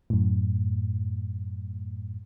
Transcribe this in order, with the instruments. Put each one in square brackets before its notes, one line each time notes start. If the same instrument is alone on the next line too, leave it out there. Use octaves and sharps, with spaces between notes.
[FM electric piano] F#2 A2